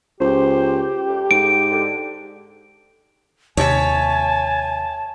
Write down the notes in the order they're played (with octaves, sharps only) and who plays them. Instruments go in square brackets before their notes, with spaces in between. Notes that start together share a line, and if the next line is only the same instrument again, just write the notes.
[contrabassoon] C#2 [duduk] G4 [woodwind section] C5
[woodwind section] F2
[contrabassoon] G#2 [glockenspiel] D7
[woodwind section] D3
[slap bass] D#2 C3 [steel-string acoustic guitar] C#5 E5 [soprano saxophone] G#5 [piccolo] A5